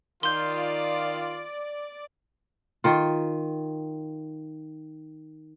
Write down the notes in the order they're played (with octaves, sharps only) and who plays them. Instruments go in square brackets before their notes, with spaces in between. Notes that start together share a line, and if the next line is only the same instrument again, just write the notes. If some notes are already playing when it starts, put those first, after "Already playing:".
[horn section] D#3 F4 [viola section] D5 [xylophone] C6 G6
[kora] D#3 F4